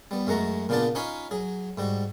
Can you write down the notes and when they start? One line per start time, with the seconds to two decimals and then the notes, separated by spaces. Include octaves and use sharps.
0.11 G3 B3
0.27 F#2 G#3 A3 F#5 A#5
0.69 A#2 C#3 B3 D4 F4 A5
0.95 C#4 D#4 F4 C#5 F5 B5
1.31 F#3 G#4
1.78 G#2 G3 F#4